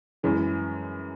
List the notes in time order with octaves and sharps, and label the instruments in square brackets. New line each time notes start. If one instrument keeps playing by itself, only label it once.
[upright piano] F#2 E3 G#3 C#4